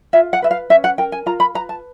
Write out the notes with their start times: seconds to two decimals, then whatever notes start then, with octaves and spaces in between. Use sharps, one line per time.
0.13 F4 E5
0.33 F#5
0.42 B4 E5
0.51 F5
0.70 C#4 E5
0.84 F#5
0.98 A#4 G5
1.12 G#5
1.26 F4 A#5
1.40 B5
1.54 B4 A#5
1.69 A5